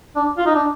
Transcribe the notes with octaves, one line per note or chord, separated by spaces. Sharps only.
D4
F4
D#4
D4